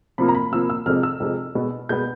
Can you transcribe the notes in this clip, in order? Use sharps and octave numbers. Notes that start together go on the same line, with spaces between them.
C3 F3 A#3 B5
A#5
B5
C3 F3 A#3 E6
E6
F2 C3 F3 G#3 F6
E6
F2 C3 F3 G#3
B2 G#3 B3
B2 G#3 B3 G6